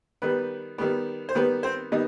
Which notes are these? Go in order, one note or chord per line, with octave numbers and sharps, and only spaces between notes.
D#3 G3 B3 B4
D#3 G3 B3
C5
D#3 G3 B3 B4
C4 C5
D#3 G3 B3 D#4 D#5